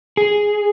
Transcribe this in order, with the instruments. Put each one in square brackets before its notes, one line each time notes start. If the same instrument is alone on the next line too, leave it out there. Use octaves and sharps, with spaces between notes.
[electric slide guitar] G#4